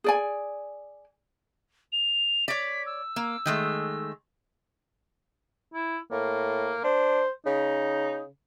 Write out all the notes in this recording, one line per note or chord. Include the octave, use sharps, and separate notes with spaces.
G#4 D5 G#5
F7
C#5 D5 B6
E6
A#3
D#3 G#3 A3
E4
A2 A#3
D4 C5
C#3 D#4